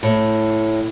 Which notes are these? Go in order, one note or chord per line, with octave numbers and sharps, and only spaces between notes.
A2